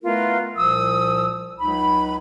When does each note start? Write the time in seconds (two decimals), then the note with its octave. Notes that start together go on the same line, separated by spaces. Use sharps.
0.03 A3 B3 E4 F4 A#4 B4
0.56 C2 A#2 F3 D#6 E6
1.59 C#2 F#3 D#4 B5